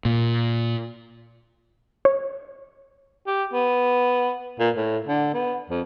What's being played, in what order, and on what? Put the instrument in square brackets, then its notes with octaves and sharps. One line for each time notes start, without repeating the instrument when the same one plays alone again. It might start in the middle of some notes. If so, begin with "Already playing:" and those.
[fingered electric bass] A#2
[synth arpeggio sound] C#5
[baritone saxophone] G4
B3
A#2
A2
D3
B3
F2